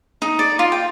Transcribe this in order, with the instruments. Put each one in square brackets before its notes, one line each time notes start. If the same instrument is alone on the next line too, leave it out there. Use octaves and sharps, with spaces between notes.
[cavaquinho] D#4
D5
F4
G5